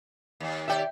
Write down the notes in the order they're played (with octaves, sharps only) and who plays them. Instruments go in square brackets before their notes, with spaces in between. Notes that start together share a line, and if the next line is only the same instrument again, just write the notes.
[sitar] D#2
[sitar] D#2 G4 D5 [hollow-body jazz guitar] E5 G5